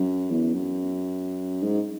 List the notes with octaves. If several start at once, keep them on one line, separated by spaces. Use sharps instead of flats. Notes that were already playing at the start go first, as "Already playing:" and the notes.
Already playing: F#2
E2
F#2
G#2